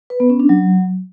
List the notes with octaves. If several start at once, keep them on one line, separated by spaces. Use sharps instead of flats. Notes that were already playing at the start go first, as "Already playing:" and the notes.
B4
B3
C#4
D4
F#3